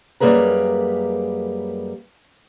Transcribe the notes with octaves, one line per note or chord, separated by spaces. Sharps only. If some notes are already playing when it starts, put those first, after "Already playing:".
F#2 G3 A#3 G#4 B4 A#5